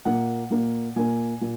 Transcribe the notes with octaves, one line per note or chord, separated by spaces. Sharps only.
A#2 A#3 F#5
A#2 A#3
A#2 A#3 G#5
A#2